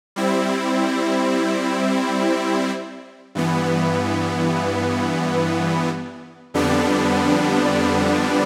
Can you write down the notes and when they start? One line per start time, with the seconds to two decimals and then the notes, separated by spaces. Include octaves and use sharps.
0.16 G3 C4 E4
3.35 G2 E3 B3
6.54 F2 D3 G3 B3 D4